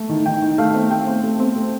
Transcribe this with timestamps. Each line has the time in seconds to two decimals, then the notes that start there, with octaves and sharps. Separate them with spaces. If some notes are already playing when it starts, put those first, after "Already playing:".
Already playing: A3
0.09 D#3
0.26 D#3 G5
0.42 D#3
0.58 A3 F5
0.74 C4
0.90 A3 G5
1.07 C4
1.24 A3
1.40 C4
1.56 A3